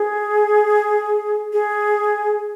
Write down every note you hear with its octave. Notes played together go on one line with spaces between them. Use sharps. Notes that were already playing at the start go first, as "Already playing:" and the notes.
Already playing: G#4
G#4